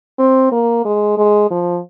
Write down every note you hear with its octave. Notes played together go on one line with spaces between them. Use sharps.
C4
A#3
G#3
G#3
F3